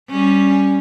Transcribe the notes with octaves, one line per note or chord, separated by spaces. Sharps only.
G3 C#4